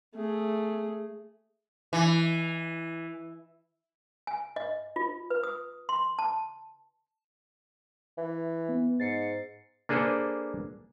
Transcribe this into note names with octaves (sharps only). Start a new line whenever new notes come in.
A3 G#4
E3
G#5
D#5
F4
B4
D#6
C6
A5
E3
B3
G#2 A6 C7 C#7
A#3 D4 G#4 A4 B4 C5